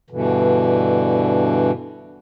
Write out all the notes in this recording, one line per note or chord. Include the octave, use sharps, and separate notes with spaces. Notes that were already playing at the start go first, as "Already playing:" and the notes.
G2 B2 D3 E3